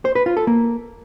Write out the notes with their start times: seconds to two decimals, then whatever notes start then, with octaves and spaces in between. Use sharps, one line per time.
0.05 C5
0.15 B4
0.26 F4
0.37 A4
0.47 A#3